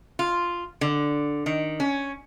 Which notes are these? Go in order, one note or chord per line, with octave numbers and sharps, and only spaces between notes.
F4
D3
D#3
C#4